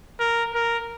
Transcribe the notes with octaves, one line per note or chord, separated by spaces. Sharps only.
A#4
A#4